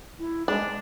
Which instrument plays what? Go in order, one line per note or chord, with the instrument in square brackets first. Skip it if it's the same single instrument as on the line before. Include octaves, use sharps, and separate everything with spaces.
[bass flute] E4
[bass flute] G#3 [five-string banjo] D4